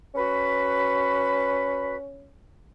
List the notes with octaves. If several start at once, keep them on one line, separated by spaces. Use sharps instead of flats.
C#4 F#4 B4 B5